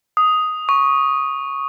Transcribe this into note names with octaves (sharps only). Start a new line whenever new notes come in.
D#6
C#6